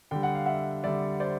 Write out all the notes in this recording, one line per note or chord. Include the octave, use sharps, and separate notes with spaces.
D3 G3 G5
F#5
F5
E5 F#5
D3 G3 D5 E5
C5 D5